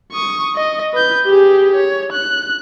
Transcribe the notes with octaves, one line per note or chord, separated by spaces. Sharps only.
C#6 D#6
D#5
B4 G6
G4 G#4
C#5
F#6